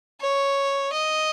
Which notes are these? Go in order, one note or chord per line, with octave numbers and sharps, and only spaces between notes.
C#5
D#5